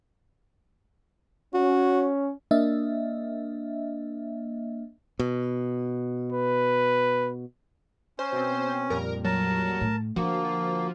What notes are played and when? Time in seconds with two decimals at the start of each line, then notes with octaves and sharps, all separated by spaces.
1.54 C#4 F#4
2.51 A#3 D4 D#5 E5
5.19 B2
6.33 B4
8.19 C#4 C5
8.32 B2 C4
8.90 F2 A#2 G3 A#4
9.24 F#3 A#4 A5
9.81 A2
10.16 D3 F3 A#3 F#4